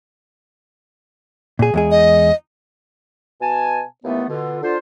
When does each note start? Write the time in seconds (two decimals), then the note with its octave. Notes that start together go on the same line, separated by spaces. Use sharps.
1.59 A#2 G#4
1.74 E2 G#3 G#4
1.91 D#5
3.41 B2 G#5 A5
4.04 D#2 E3 A3 B3
4.29 B2 D3 F4
4.62 D3 F4 C5